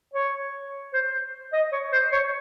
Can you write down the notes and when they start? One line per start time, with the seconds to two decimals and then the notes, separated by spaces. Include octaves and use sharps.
0.13 C#5
0.93 C5
1.53 D#5
1.72 C#5
1.92 C5
2.12 C#5